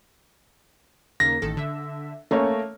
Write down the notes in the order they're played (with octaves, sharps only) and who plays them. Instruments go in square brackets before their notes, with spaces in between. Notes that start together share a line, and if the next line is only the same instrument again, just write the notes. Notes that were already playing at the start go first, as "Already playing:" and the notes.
[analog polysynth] D#2 C#3 A#3 [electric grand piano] A#6
[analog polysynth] A1 D#3 A4
D3 E5
[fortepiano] A3 A#3 C#5 [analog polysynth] C#4